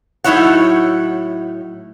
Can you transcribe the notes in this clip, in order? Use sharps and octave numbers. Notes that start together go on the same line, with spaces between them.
A2 F#3 D#4 E4 C#5 F#5